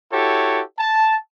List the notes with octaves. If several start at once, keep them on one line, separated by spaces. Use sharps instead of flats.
E4 F#4 G4 A4 C#5
A5